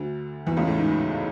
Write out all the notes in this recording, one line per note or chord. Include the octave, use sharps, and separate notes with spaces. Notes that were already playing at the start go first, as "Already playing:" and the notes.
Already playing: D2 D3
E2 E3
C#2 C#3
A2
G#2